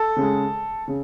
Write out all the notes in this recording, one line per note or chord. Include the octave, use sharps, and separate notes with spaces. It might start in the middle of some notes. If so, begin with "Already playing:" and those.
Already playing: A4
C#3 G#3
C#3